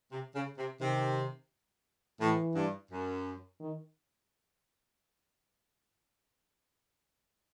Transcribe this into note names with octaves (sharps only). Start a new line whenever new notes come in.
C3
C#3
C3
C3 D#3
A2 E3
G2
F#2
D#3